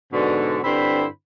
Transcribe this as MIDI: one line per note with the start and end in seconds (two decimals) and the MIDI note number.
0.12 0.58 44
0.12 0.58 47
0.12 0.58 50
0.63 1.05 43
0.63 1.05 50
0.63 1.05 60
0.63 1.05 64
0.63 1.05 72
0.63 1.05 83